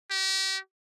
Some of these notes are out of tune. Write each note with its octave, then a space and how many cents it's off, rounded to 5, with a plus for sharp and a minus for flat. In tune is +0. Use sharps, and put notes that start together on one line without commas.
G4 -35